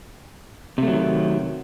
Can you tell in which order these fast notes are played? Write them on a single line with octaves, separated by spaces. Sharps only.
C3 A3 F#3 D#3